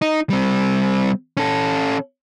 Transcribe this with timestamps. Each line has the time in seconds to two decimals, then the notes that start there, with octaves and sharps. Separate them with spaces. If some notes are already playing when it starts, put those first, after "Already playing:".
0.02 D#4
0.30 G3 C4
1.37 C#4 A4